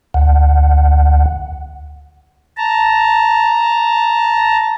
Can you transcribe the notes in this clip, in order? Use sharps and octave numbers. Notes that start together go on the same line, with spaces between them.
D2 F#5
A5 A#5